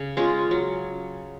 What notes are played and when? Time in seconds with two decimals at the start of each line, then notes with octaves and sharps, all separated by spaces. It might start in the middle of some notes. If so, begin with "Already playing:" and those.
Already playing: C#3
0.17 G#3 C#4 F4
0.51 F#3